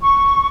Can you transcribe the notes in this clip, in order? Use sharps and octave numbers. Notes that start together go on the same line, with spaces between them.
C#6